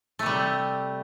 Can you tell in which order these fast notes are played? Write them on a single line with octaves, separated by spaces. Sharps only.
A3 C3 G3